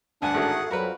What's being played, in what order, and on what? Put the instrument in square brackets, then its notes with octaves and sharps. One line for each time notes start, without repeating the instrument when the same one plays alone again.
[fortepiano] D2 G2 G#5 [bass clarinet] D4 [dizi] F#5
[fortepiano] A1 G#2 D#3 [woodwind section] A3 F#4 G#4
[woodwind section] F2 G3 B5 [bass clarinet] F#3 [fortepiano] F#4 A#4 B4